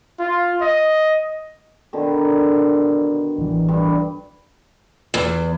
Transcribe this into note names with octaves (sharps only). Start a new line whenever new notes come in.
F4
D#5
B2 D3 D#3
A1 E3
G2 B4
E2